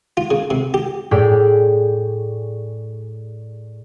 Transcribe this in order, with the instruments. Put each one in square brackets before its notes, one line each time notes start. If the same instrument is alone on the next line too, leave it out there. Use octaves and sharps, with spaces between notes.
[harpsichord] F4
C#3
C3
G4
[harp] A2 G4 G#4 D5